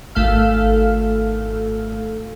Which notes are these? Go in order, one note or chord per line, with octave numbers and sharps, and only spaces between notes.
G#1 A3 A4 F5 F6